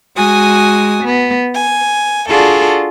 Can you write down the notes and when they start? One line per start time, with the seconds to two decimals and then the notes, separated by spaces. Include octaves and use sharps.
0.17 G#3 F#4 G#5 D#6
1.03 B3
1.55 G#5
2.29 D4 F4 F#4 G#4 A4 D5